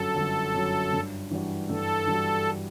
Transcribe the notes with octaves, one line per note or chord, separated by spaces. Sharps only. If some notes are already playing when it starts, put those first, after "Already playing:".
Already playing: G1 F#2 F#3 A4
G1
F#2 F#3
G2
E3 G3 D4 F#4
G2 A4
E3 G3 D4 F#4